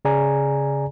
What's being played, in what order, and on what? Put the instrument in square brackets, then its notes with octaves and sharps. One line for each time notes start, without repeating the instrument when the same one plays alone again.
[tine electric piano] C#3 G#4 D5 G#5 A#5